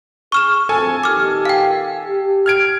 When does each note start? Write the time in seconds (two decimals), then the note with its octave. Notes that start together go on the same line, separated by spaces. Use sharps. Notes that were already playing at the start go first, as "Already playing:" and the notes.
0.32 G#4 C#6 F6 E7
0.69 D2 F3 C4 A4 G#5
1.03 A#2 D#3 G4 D6 F6
1.45 F5 G5
2.06 G4
2.46 F6 G#6 D7